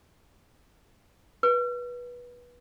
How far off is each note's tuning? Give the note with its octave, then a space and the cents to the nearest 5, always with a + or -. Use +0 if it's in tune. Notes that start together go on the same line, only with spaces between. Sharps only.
B4 -20